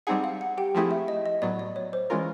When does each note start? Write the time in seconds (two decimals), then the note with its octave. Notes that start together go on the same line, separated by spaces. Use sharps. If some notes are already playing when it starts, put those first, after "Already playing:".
0.07 G3 C4 D#4 G#4 F#5
0.24 F5
0.41 F#5
0.58 G4 G5
0.75 F3 A3 C4 E4 G#4
0.91 E5
1.08 D#5
1.26 D#5
1.42 A2 F#3 B3 D5
1.59 D5
1.76 C#5
1.93 C5
2.10 E3 G#3 C#4 F4 A#4